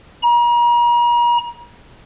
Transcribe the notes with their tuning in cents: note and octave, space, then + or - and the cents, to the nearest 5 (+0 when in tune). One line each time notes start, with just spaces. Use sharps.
A#5 +40